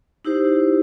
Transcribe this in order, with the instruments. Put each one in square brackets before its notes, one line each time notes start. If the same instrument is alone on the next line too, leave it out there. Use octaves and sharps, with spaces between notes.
[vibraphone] D#4 E4 G4 C5